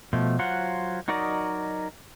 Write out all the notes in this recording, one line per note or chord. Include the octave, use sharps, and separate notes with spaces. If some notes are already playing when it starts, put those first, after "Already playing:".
B2 F3 A3
F#3 F4 C5 F#5
F#3 D#4 F#4 A#4 D5 D#5